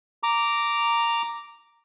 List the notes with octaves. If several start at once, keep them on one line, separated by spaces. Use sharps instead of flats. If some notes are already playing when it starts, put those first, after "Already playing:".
A#5 D6